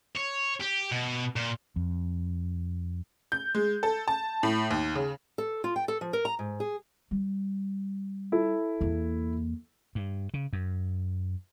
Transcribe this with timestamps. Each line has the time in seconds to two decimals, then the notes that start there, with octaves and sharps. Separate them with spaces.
0.15 C#5
0.60 G4
0.91 B2
1.36 A#2
1.76 F2
3.32 G6
3.55 G#3
3.83 A4
4.08 A5
4.43 A2
4.71 D#2
4.95 C#3
5.38 A4
5.64 F4
5.76 G5
5.88 A4
6.01 F3
6.13 A#4
6.25 A#5
6.39 G#2
6.60 G#4
7.11 G3
8.32 E4 A4
8.81 E2 A#3
9.95 G2
10.34 C#3
10.53 F#2